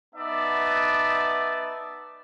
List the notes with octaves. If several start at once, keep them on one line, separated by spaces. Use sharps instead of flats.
B3 D#4 D5 E5 A5